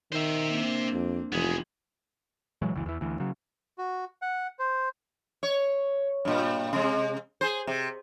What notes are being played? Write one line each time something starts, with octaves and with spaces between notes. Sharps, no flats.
D#3 C5 E5
A#3 C4 D4
F2
F1 E3 B3 D#4 F4 G#4
A#2 E3 F#3 G#3
F#1 C#2 E3
E2 E3
D2 E3
C#3 F#3
F#4
F#5
C5
C#5
G2 A#2
C3 G#3
G#4 C5
C3